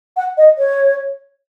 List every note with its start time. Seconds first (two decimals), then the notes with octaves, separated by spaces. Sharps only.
0.17 F#5
0.37 D#5
0.58 C#5